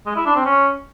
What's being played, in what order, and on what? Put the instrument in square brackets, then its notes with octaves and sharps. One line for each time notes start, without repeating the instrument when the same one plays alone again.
[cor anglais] G#3
E4
D4
C4
C#4